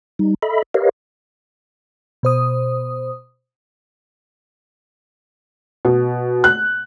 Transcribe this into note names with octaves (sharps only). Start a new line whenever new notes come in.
G3 D#4
A4 D#5 E5 B5
G4 A#4 B4 C#5 D#5 F5
B2 C5 D#6
B2
F#6